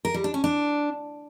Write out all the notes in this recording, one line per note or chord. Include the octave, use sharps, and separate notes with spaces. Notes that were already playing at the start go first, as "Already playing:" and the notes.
A#4
G3
D4
C#4
D4